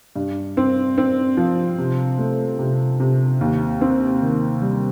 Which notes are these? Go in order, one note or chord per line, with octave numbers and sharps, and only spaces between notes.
G2
C4
C4
F3
C3
A3
C3
C3
D#2
C4
D#3
G3